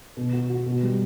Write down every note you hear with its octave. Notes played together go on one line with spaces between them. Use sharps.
B2
F#4
F#4
B2
G3